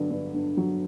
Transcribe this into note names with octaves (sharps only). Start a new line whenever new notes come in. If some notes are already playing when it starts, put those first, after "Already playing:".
Already playing: G2 D3 F#3
G2
G2
F#3